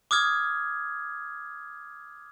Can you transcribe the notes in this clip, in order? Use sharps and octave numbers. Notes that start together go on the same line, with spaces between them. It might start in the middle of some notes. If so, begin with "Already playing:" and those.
D6 D#6 F6 G#6